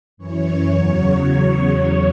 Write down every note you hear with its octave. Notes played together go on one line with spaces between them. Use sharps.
F#2 E3 C#5
E2 C#3 F#3